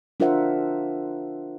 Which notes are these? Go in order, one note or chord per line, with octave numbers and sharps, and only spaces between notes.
D4 F4 A#4 C5 E5 F#5